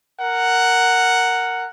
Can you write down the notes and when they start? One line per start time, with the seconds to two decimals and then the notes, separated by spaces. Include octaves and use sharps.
0.20 A#4 F#5